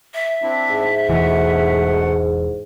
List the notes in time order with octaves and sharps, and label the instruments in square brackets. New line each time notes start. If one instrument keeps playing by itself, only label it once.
[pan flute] E5
[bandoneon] C4 D4 E4
[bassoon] G#2
[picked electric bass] E1 E3 [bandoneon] B2 A3 F#5